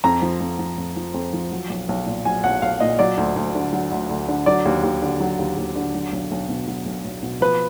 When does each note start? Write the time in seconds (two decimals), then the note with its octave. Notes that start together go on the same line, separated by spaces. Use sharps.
0.04 F2 A#5
0.22 F3
0.41 F2
0.59 F3
0.78 F2
0.96 F3
1.14 F2
1.33 F3
1.52 F#3
1.70 B1
1.89 B1
2.06 A#2
2.25 F#3 G#5
2.44 B1 F#5
2.62 B1 F5
2.80 A#2 D#5
2.99 F#3 D5
3.17 D2
3.36 D2
3.55 D3
3.73 F#3
3.91 D2
4.09 D2
4.28 D3
4.46 F#3 D5
4.65 D#2
4.83 D#2
5.02 D3
5.20 F#3
5.39 D#2
5.57 D#2
5.76 D3
5.94 F#3
6.12 B1
6.31 B1
6.49 B2
6.68 F#3
6.86 B1
7.05 B1
7.23 B2
7.41 F3 B4